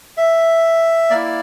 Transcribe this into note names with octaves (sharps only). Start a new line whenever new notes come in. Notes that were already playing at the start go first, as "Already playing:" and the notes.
E5
A#3 E4 D5